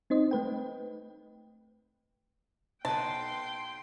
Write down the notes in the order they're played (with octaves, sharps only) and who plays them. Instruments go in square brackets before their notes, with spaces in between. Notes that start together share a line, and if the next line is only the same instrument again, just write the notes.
[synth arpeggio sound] C4 D#4 C5 D#5
A3 B4 G5
[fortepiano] B1 B4 [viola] G5 C6 [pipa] A5